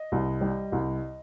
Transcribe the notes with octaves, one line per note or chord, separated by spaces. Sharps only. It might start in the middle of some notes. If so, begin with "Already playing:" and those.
Already playing: D#5
C2
G3
C2